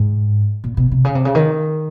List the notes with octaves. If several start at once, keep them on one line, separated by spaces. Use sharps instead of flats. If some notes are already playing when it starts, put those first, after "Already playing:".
Already playing: G#2
A#2
B2
C3
C#3
C3
C#3
D#3